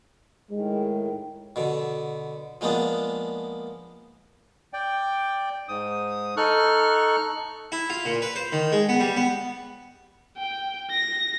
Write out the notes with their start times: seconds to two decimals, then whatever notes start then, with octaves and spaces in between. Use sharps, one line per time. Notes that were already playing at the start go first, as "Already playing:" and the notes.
0.51 A2 D#3 G#3
1.56 B2 D3
2.61 F3 G#3 A#3 B3 D4
4.73 D5 G5
5.69 G#2 D#6
6.37 D#4 A4 C#6 F6 F#6
7.72 E4
7.90 F4
8.05 A#2
8.22 B4
8.36 C5
8.53 D#3
8.72 G#3
8.89 B3
9.00 G3
9.17 B3
10.38 G5
10.91 A#6